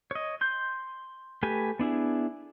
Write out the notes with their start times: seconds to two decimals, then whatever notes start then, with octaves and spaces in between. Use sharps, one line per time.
0.11 C#5 D#5
0.41 C6 G6
1.43 A3 G4 B4 G#5
1.79 B3 D4 E4 G#4